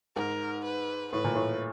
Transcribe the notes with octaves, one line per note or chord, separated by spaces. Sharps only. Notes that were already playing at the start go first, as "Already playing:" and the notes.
G#2 A#4
B4
A2 B4
A#2
A2